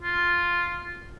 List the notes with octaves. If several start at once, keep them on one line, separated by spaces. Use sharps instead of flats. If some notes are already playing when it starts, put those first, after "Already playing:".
F4